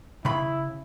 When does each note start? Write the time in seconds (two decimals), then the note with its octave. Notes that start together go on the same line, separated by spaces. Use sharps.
0.25 C#3 E4 B5